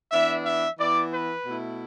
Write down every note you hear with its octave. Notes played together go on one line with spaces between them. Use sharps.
E3 B3 D4 E5
E5
E3 B3 E4 D5
B4
B2 A3 E4